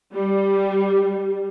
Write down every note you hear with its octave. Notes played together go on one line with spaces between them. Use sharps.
G3